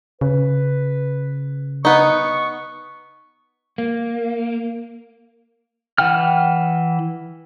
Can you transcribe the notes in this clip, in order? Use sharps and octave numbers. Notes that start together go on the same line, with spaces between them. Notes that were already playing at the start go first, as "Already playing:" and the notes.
C#3 B4
B3 D#4 C#6
A#3
E3 F#5 G5 F6